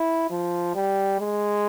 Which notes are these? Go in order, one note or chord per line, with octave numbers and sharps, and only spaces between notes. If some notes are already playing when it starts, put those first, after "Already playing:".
Already playing: E4
F3
G3
G#3